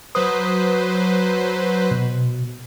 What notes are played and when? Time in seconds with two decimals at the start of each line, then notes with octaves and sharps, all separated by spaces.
0.15 F#3 B4 C5 D#6
1.91 B2